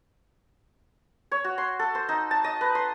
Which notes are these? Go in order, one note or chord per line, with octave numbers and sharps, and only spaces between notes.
C#5
F#4
C6
A4
C5
D#4
A5
D#5
B4
C6